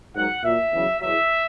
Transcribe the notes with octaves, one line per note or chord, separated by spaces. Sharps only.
G#2 D#3 F#3 F#5
A#2 F#3 E5
E2 C#3 F#3
E2 B2 F#3 E5